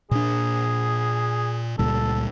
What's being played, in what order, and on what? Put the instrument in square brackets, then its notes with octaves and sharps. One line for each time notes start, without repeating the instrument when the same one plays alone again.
[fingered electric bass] A#2 D4 [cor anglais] G#4
[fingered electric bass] C#2 A#2 G3 [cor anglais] A4